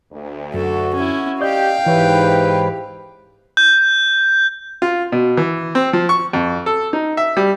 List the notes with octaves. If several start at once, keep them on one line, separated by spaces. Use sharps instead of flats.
D2
F#2 F#4 A4
C#4 E4
G4 D5 D#5 F5 G5 G6
G#2 E3 E4 G4 B4 C#5 E5
G6
F4
B2
E3
C4
F3
C#6
F2
A4
D#4
E5
G3